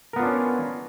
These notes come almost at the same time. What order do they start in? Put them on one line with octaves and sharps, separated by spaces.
A#4 B3 F4 D4 C#4